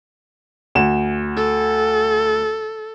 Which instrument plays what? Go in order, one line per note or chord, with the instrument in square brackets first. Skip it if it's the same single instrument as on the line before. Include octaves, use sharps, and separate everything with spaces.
[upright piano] D2 E7
[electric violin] A4